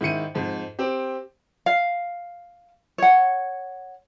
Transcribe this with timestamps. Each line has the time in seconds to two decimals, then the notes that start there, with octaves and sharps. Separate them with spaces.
0.01 G#2 D#3 E4 C#7 D#7
0.35 F2 G#2
0.79 C4 G4
1.66 F5
2.98 C#5 F#5